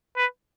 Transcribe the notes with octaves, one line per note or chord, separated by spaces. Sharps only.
B4